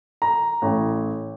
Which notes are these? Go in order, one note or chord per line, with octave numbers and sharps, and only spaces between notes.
A#5
A1